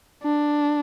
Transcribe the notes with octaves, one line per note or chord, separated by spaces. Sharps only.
D4